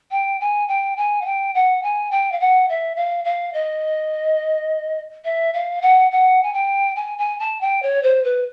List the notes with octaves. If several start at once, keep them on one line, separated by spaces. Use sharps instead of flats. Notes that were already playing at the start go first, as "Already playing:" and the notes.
G5
G#5
G5
G#5
F#5
G5
F#5
G#5
G5
F5
F#5
E5
F5
F5
D#5
E5
F5
F#5
F#5
G#5
G5
G#5
G#5
A5
G5
C#5
C5
B4